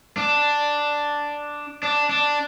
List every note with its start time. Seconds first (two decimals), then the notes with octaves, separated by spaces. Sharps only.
0.17 D4
1.83 D4
2.10 D4